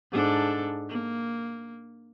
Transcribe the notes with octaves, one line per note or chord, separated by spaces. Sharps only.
G#2 D4 A4
A#3